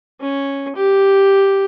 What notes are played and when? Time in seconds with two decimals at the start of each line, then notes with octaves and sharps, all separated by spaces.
0.21 C#4
0.76 G4